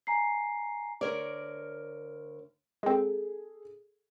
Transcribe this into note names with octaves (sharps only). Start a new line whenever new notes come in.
G#5 A#5 C7
D2 A#4 C#5 D5
G#3 C4 G#4 A4